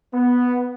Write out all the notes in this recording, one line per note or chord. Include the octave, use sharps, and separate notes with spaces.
B3